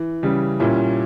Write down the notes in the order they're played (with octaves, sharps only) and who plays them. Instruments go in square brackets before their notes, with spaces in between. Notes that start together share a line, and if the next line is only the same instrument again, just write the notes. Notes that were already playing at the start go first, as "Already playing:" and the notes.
Already playing: [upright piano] E3
C#3 E3 G3
A#2 G3 C#4 E4